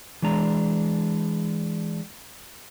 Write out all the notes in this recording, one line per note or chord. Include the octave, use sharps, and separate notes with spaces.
E3 G#3 D4 A#5